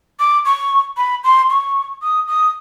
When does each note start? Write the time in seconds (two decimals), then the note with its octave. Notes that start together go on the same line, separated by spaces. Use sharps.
0.20 D6
0.45 C#6
0.97 B5
1.24 C6
1.50 C#6
2.02 D#6
2.28 D#6